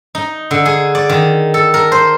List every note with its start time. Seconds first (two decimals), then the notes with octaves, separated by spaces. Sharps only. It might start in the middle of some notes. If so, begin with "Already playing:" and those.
0.15 D#4
0.51 D3
0.65 G#4
0.95 D5
1.09 D#3
1.54 A4
1.74 A#4
1.92 C5